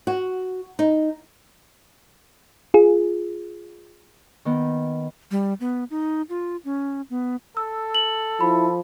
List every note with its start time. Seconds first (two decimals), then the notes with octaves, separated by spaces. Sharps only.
0.07 F#4
0.79 D#4
2.74 F4 G#4
4.45 D#3 B3
5.31 G3
5.60 B3
5.90 D#4
6.29 F4
6.65 C#4
7.10 B3
7.57 A4 E6
7.95 F#7
8.41 F3 E4 B5